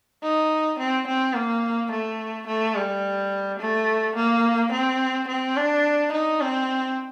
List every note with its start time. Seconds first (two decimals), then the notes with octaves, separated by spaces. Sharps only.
0.23 D#4
0.79 C4
1.07 C4
1.35 A#3
1.92 A3
2.47 A3
2.76 G3
3.59 A3
4.16 A#3
4.73 C4
5.28 C4
5.56 D4
6.12 D#4
6.41 C4